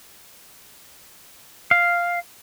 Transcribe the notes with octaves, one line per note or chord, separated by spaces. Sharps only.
F5